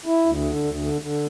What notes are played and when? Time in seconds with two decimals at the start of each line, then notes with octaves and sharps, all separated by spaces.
0.06 E4
0.26 D2
0.45 D3
0.64 D2
0.83 D3
1.01 D3